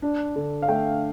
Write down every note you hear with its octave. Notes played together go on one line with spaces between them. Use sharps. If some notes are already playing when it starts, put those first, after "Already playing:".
D4
D3
F5
A3 G5